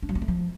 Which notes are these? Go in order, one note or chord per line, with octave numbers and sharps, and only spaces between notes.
D4
F#3
A#3
A3
F3